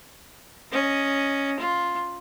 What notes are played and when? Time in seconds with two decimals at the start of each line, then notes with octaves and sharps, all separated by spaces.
0.72 C#4 D#5
1.60 F4